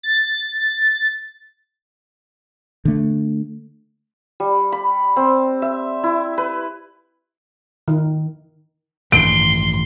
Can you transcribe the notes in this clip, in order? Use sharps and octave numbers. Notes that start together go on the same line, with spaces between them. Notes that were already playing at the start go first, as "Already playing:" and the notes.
A6
D3 A3
G3
B5
C4
E5
E4
B4
D#3
A1 G2 D#3 C6 D7